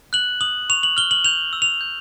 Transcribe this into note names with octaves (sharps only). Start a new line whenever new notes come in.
F#6 F#7
D#6 F#7
C#6 F7
F#7
F6 G7
F#7
G6 F7
E6
F7
G6